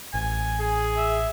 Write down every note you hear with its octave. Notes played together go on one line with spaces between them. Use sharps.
A1 G#5
G#4
E5